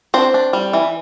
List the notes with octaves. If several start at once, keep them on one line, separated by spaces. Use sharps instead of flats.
C4 D4 C5
D4
G3
E3